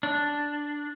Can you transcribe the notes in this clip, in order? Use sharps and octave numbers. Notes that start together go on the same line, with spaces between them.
D4